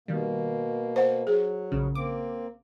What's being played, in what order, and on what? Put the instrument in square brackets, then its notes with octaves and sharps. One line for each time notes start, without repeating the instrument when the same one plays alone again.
[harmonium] B2 A#3 [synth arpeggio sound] D#3 G3
[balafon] C5 F#5
[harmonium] F#3 [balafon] G#4
[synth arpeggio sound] A#1 C#3
[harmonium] A#3 C4 [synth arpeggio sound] D6